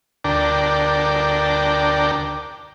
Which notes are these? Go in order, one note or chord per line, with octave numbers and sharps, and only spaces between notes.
D2 D4 A#4 D5 G5 A5